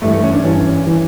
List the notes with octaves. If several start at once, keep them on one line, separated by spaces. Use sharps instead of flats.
G2 E3 A3
A3
C#4
D4
G2 E3 C#4
E3